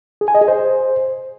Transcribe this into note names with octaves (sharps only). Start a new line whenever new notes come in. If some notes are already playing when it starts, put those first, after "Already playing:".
G#4
G#5
D#5
G#4
C5